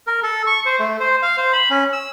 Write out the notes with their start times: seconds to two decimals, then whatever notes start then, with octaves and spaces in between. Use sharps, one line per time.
0.07 A#4
0.23 A4
0.47 C#6
0.66 C5
0.80 A3
1.00 C5
1.22 F5
1.37 C5
1.53 B5
1.70 C#4
1.93 E6